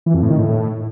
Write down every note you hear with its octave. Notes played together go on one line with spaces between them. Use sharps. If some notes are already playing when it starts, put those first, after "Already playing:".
E3
F2
A2
D#3
A2